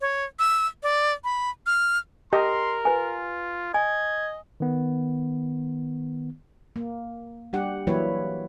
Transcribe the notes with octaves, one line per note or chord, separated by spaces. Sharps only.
C#5
E6
D5
B5
F6
G4 A#4 D#5 C6
F4 B4 G#5
D#5 G#5 G#6
D#3 B3
A#3
G3 D4 G4 F#5
E3 F#3 A#3 E4 B4 C#5